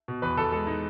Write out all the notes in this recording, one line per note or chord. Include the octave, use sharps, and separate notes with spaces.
B2
E2 B4
E2 A4
G#3 A4
G#3 D#4